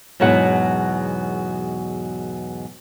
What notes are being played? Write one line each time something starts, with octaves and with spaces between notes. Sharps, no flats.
E2 G#2 B2 F#3 F#5